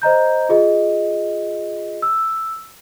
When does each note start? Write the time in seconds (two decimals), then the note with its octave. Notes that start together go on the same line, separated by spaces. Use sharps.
0.02 C5 D#5 A#5 G6
0.49 F4 G#4 D#5
2.02 E6